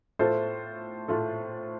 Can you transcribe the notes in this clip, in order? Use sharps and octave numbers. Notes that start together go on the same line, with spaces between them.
A2 A3 F4 A4 C5
A2 A3 F4 A4